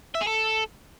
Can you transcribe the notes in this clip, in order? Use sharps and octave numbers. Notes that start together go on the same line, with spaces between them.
E5
G#4
A4